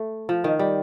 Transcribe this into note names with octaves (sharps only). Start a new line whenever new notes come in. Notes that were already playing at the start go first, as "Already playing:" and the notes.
Already playing: A3
F3
D#3
G3